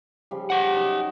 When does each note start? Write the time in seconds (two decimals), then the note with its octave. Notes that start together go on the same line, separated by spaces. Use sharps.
0.31 C#3 F3 G3
0.50 G4 F#5
0.74 F#3 D#4